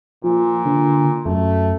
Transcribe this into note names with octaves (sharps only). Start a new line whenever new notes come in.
A#2 F3
D3
F#2 A3